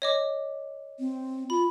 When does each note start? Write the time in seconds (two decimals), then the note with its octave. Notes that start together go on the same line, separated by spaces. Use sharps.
0.02 C#5 D#5 D6
1.00 C4
1.50 F4 B5